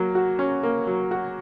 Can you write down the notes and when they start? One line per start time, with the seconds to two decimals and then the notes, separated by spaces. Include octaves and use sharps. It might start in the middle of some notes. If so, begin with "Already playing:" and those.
Already playing: F#3 A#3
0.15 F#4
0.39 C#4
0.63 A#3
0.87 F#3
1.11 F#4